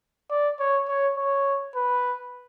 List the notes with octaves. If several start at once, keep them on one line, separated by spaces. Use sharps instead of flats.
D5
C#5
C#5
C#5
B4